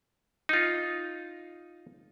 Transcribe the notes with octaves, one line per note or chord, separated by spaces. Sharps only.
D#4 F4